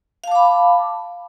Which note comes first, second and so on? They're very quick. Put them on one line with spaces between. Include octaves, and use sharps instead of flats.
F5 A5 D6 B5